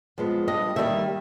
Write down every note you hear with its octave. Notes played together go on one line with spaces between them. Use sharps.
F3 G#3 B3
G2 D#5
D#3 G3 A#3 D#4 E5